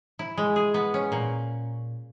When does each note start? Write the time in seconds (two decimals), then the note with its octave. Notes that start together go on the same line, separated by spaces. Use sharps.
0.19 E4
0.37 G#3
0.56 G#4
0.74 B3
0.94 C#4
1.12 A#2